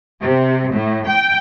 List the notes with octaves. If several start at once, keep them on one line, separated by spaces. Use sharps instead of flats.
C3
A2
G5